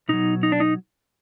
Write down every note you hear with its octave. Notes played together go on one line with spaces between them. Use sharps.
B2 F#3 D#4
D#4
D4
D#4